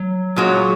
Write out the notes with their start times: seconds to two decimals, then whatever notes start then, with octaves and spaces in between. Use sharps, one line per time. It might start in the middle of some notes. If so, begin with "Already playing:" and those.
Already playing: F#3
0.36 A#2 G#3 F#4 C#5